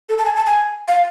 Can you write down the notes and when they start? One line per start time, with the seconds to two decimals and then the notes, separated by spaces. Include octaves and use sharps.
0.09 A4
0.18 A5
0.25 G#5
0.36 A5
0.47 G#5
0.88 F5